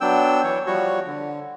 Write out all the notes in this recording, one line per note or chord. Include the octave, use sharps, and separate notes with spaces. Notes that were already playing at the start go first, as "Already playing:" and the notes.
F#3 B3 D4 G5 E6
E3 C#5
F3 G3 F#4 C#5
D3